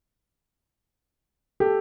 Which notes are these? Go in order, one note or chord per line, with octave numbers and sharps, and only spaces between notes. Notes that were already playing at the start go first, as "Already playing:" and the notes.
G4 A4